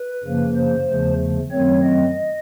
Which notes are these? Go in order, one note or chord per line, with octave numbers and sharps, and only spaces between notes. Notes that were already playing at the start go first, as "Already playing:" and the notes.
Already playing: B4
F#2 C#3 F3 A#3
C5
E2 C#3 F3 A3
F#2 D#3 F#3 A3 C4 C#5
D#5